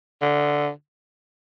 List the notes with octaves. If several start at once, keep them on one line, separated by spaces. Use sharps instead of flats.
D3